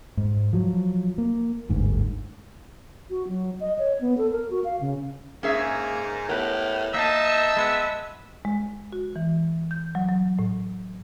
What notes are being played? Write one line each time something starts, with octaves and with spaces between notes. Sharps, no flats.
G#2
F3 F#3
A#3
G1 D2 G#2
F#4
F#3
D#5
C#5
B3
A4
A#4
F#4
F5
C#3
G#2 A#3 C#4 G#4 E5
A2 B3 G4 A#4
A#3 D#4 D#5 E5 A5
G#3 B3
G#3
F#4
E3
G6
F#3
F#3
A2